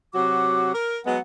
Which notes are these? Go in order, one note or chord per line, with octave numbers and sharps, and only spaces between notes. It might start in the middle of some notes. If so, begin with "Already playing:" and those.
C3 F#3 F#4 D6
A#4
F#3 G#3 B3 F#5